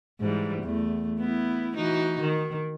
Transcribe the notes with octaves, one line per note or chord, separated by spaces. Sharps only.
G#2 E3 G3
E2 A3
B3 E4
E3 D#4 F#4
D#3